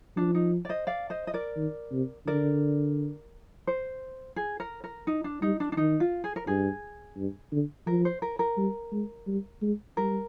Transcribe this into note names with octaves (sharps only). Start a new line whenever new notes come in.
F3 D4
D#4
D5
C5 D#5
D5 F5
C5 D#5
D#5
A#4 D5
D#3
C3
D3 A#4 D5
C5
G#4
A#4
A#4
D#4
D4
G3 D#4
D4
D4
D#3 D#4
F4
G#4
A#4
G2 G#4
G2
D3
F3 A#4
C5
A#4
A#4
G3
G#3
G3
G#3
G3 A#4